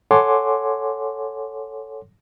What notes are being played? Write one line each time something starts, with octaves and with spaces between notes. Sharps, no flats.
A4 C#5 F#5 G#5 C6 D6